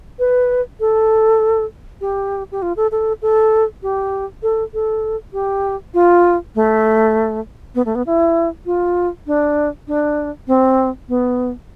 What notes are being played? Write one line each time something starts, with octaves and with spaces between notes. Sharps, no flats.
B4
A4
G4
G4
F4
A4
A4
A4
G4
A4
A4
G4
F4
A3
B3
A3
B3
E4
F4
D4
D4
C4
B3